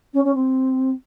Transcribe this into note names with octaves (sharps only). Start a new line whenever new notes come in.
C#4
C#4
C4